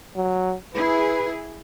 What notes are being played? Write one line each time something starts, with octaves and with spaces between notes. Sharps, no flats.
F#3
E4 G#4 B4